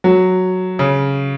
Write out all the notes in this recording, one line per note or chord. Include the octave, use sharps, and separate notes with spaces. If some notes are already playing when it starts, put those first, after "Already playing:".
F#3
C#3